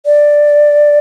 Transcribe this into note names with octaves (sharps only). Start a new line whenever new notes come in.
D5